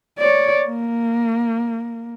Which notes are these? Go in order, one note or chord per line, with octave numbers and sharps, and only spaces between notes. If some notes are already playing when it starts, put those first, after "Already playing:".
C#5 D5
A#3